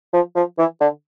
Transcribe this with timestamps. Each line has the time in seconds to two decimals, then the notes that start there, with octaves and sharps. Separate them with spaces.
0.13 F3
0.36 F3
0.58 E3
0.80 D3